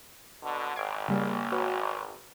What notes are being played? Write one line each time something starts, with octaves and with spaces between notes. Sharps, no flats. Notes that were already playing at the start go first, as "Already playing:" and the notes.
B2 D3
G#1 G#6 C7 D7
C#3 G3 A#3
F#4 B4 C#5